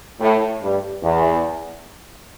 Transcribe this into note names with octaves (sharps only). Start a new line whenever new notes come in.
A2
G2
E2